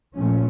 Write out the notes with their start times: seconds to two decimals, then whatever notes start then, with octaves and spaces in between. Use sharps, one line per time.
0.17 A#2 F3 A3 C#4